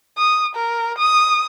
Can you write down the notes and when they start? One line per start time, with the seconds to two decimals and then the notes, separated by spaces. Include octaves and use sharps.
0.18 D#6
0.55 A#4
0.98 D#6